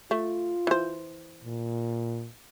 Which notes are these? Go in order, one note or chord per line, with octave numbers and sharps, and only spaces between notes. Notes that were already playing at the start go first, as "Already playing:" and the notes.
A3 F4
E3 C5
A#2